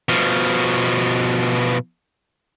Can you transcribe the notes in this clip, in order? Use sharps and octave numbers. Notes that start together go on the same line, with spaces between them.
B2 F3